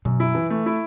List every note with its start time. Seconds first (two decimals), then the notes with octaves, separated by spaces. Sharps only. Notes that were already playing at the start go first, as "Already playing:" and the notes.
0.05 F#2 B2
0.20 E4
0.35 E3
0.50 A3
0.66 E4